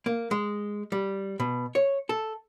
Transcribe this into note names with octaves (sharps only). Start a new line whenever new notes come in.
A#3
G#3
G3
B2
C#5
A4